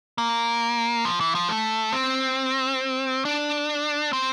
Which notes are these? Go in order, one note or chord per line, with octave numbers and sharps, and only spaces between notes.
A#3
F3
E3
F3
A3
C4
D4
C4